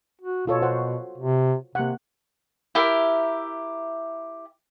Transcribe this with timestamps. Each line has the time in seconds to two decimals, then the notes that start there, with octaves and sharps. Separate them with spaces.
0.22 F#4
0.47 B2 F4 A4 C#5
0.62 F#4 C5 F#5
1.18 C3
1.75 C3 A#3 F#5
2.75 E4 G4 A#4 E5